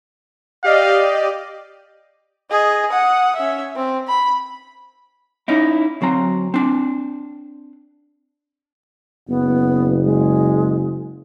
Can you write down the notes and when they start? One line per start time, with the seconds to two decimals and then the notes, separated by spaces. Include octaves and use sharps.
0.64 G4 D5 D#5 F5
2.50 G#4 D#5
2.91 F#5 D#6
3.36 C#4 E5
3.76 C4
4.08 B5
5.48 C#4 D#4 E4
6.01 D2 F#3 C4 A#5
6.54 C4 D4
9.28 F#1 B3
10.03 G#3